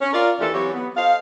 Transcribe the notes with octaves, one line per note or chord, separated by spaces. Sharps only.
C#4
F4 A#4 D5
D#2 E3 F4 G4 A4
E3 F#3 C4 F#4 G4 C#5
B3
A4 C5 D#5 F5